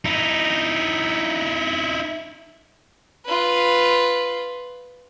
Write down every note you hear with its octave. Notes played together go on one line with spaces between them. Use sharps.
D#4 E4
F4 B4